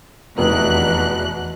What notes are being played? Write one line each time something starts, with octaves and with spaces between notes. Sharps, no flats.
F1 E2 B2 F#6